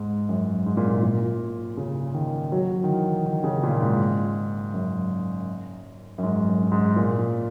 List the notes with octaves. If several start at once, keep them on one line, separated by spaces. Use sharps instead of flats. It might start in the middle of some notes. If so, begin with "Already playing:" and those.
Already playing: G#2
F#2
G#2
A#2
G#2
A#2
C#3
D#3
F#3
D#3
E3
D#3
C#3
A#2
G#2
F#2
F#2
G#2
F#2
G#2
A#2